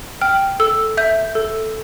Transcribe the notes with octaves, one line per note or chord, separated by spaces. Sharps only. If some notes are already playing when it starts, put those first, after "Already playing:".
G5 F6
A4 E6
E5 G6
A4